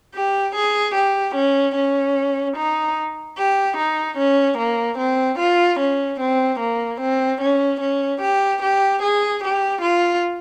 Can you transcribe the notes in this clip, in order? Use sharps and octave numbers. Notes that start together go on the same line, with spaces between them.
G4
G#4
G4
C#4
C#4
D#4
G4
D#4
C#4
A#3
C4
F4
C#4
C4
A#3
C4
C#4
C#4
G4
G4
G#4
G4
F4